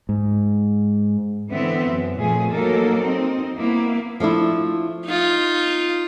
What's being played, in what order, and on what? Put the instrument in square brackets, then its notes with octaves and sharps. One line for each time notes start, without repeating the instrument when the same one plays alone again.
[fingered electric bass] G#2
[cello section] D3 E3 B3 C4 E5
F#2
A#2 F3 A3 G#4
F#3 A#3 D#4 A4 A#4
C4 D#4
A#3 B3 E4
[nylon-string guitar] F3 A3 D4 E4
[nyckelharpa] D#4 F4